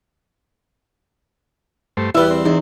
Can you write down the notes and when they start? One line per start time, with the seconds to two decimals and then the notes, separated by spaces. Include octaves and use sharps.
1.97 G2 A3 C5
2.15 E2 G3 E4 F4 B4 E5
2.31 C4
2.46 E2 D#4